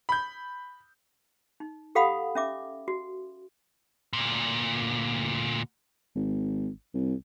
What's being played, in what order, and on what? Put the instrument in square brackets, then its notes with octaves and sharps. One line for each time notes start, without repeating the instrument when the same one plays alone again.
[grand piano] B5 G6
[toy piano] D#4
G4 A4 F5 F#5 B5 D#6
C#4 E5 D6
F#4
[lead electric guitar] D2 A#2
[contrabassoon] G#1
C2